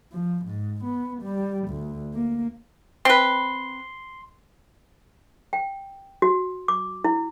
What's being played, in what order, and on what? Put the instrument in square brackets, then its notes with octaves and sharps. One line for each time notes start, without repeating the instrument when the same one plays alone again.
[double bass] F3
G#2
B3
G3
D2
A#3
[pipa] C4 B4 [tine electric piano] C6
[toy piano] G5
F#4
D6
E4